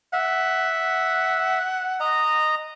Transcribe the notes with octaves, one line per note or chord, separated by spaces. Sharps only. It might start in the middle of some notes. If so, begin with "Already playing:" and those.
E5 F#5
D#5 A#5